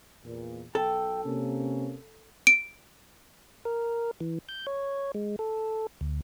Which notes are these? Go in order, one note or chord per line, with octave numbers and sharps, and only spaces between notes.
E2 A#2
B1 A4 G5
C3 A#3 C#4
D7
A#4
E3
G6
C#5
G#3
A4
D2